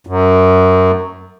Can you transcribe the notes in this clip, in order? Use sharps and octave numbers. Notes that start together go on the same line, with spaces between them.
F#2